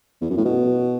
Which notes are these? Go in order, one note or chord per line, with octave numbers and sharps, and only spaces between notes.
E2
F#2
A2
B2